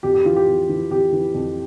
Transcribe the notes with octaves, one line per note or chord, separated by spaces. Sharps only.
F2 G4
G4
E3 F4
G4
F2
E3
F2 G4
E3
F2